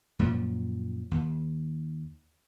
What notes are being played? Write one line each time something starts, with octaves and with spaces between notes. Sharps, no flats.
F#2 A#2 F3 F#3
D#2